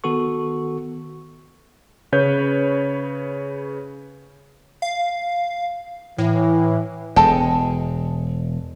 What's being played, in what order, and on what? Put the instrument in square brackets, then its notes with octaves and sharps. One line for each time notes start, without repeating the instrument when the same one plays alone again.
[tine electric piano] D#3 B3 F#4 A4 C#6
[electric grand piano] C#3 B4 C#5 G6
[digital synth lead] F5
[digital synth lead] A2 [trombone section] E3
[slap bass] E1 [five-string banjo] G#3 A4 G5